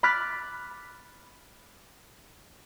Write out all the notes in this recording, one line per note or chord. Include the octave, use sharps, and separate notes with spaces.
B5 D6 F6 F#6 A6 B6